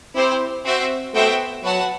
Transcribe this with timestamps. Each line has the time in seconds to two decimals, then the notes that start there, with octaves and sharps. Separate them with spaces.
0.15 C4 E4 G4 C5
0.64 C4 F#4 C5 E5
1.14 A3 B3 F#4 C5 E5 G5
1.64 F#3 F#4 B4 F#5 A5